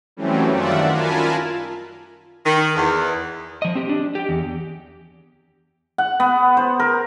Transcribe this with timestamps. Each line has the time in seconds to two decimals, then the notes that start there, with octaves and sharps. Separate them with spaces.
0.17 E3 F#3 G3 A3 C4 C#4
0.49 F#2 D#3 F4 D5 E5 F#5
0.89 F4 A#4 G#5 A5 B5
2.45 D#3
2.76 E2
3.62 F3 D#5
3.75 C4 G4
3.89 D4
4.15 G4 G5
4.29 E2
5.98 F#5
6.20 B3
6.57 C5
6.80 A#4